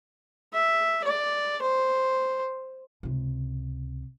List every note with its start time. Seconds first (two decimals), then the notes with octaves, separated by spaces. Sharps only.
0.54 E5
1.05 D5
1.62 C5
3.03 C#2 C3